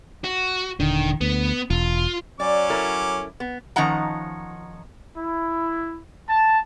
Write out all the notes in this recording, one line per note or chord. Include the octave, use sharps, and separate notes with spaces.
F#4
D#1 D3 D#3
D2 B3
E1 F4
F#3 C#4 D5 D6
E4 A4 A#4
B3
D#3 F3 C#4 D#4 F#5 A#5
E4
A5